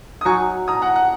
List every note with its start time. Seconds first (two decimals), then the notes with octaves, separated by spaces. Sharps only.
0.21 D#6
0.25 F#3 D#4 F#4 G#5 C#6
0.68 A#5 D#6
0.82 F#5 A#5
0.96 F#5